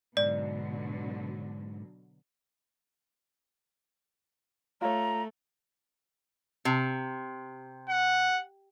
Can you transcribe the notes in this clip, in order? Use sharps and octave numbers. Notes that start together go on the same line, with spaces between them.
G#2 B2 D3 F#3 D5
A3 F4 C#5 A#5
C3
F#5